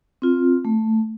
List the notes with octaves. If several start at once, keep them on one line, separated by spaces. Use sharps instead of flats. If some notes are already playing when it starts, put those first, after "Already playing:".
C4 F4
A3